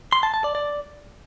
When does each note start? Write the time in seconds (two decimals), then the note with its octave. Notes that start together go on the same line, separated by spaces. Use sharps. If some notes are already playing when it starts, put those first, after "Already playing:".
0.12 C6
0.23 A5
0.34 A5
0.44 D5
0.55 D5